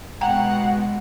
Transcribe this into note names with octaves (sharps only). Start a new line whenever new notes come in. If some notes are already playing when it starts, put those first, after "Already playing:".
B2 G#3 F#5 G5 A#5